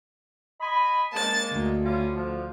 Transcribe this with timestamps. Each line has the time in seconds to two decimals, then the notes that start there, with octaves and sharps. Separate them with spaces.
0.61 D#5 G#5 B5
1.13 G#3 A#3 A5 A6
1.51 D2
1.84 G3 C#4 F4
2.15 D3 F3